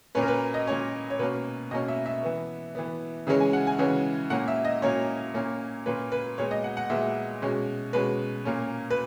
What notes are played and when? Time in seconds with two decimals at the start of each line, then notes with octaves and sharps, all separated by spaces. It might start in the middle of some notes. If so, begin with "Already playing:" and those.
0.15 A#2 A#3 C#4 B4
0.22 A#4
0.28 B4
0.54 D#5
0.67 A#2 A#3 C#4 C#5
1.10 C#5
1.19 B2 A#3 C#4 B4
1.71 B2 A#3 C#4 D#5
1.88 E5
2.06 E5
2.23 E3 B3
2.75 E3 B3
3.27 C#3 E3 G#3 C#4
3.40 G#5
3.53 F#5
3.67 G#5
3.78 C#3 E3 G#3 C#4
4.30 A#2 A#3 C#4 F#5
4.48 E5
4.65 D#5
4.82 A#2 A#3 C#4 C#5
5.34 A#2 A#3 C#4
5.86 A#2 A#3 C#4 B4
6.12 B4
6.38 A#2 G#3 B3 C#5
6.51 D#5
6.64 F#5
6.77 F#5
6.90 A#2 G#3 B3 E5
7.42 B2 G#3 C#4
7.93 B2 G#3 C#4 B4
8.45 A#2 A#3 C#4
8.91 B4